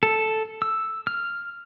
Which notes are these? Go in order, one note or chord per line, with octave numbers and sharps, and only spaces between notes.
A4
E6
F6